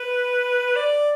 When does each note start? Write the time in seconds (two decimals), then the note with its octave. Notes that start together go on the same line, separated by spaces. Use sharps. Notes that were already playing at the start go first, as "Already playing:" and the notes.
Already playing: B4
0.76 D5